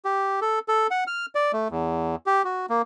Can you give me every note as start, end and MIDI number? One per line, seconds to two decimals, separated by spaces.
0.05 0.40 67
0.42 0.59 69
0.68 0.87 69
0.91 1.04 78
1.07 1.26 89
1.35 1.52 74
1.53 1.68 57
1.71 2.16 40
2.26 2.43 67
2.45 2.66 66
2.70 2.82 58